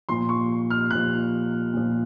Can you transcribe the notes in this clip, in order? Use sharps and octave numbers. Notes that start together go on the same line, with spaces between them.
A#2 F3 C6
C#6
F6
A#2 F3 F#6
A#2 F3